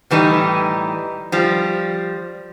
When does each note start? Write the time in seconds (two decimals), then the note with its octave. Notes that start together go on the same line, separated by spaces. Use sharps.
0.11 A2 E3 G3 D#4
1.32 F3 G3